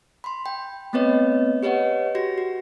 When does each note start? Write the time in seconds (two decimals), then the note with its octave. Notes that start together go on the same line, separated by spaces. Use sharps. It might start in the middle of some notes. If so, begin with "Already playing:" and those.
0.24 B5 C6
0.46 G5
0.93 A3 B3 C4 B4 C#5 D#5
1.63 G4 B4 C#5 D#5 F#5
2.15 F#4 G4 A#6
2.38 F#4